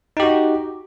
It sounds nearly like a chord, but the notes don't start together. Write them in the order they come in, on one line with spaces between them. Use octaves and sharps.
D#4 G4 F#4